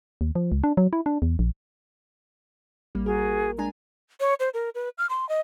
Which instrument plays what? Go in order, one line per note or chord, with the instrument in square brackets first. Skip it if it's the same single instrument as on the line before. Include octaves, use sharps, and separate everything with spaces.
[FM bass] D#2
F3
C#2
D4
F#3
E4
D4
E2
A#1
[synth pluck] A1 G3 A#3
[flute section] F#4 G#4 [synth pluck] A#4
[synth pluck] G#3 D4 G#5 [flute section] A#5
[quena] C#5
C5
A#4
B4
F6
C6
D#5